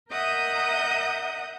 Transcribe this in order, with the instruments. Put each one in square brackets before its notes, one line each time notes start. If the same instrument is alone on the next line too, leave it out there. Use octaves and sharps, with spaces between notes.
[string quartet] A#4 D#5 E5 F#5 D#6 G6